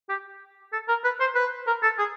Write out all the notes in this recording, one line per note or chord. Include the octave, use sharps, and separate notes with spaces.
G4
A4
A#4
B4
C5
B4
A#4
A4
G#4